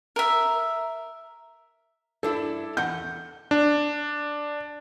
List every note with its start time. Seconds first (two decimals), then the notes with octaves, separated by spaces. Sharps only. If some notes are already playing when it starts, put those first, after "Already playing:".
0.16 A#4 E5
2.23 G2 D4 E4 A4
2.77 E2 F#5 G6
3.51 D4